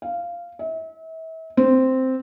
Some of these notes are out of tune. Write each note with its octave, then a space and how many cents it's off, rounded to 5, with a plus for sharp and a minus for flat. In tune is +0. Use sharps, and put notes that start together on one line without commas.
F5 -10
E5 -35
C4 -5